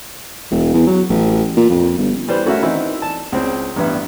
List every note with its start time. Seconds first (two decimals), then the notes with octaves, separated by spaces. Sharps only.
0.51 E1
0.74 E2
0.87 F#3
1.10 A1
1.57 A#2
1.70 F2
1.98 G1
2.28 E3 G3 B4 C5
2.46 A3 C#4 F#4 A#4 E5
2.63 D#3 E3 C4 D#4 E4
3.02 A5
3.32 C#2 C4
3.76 A1 G2 B3 E5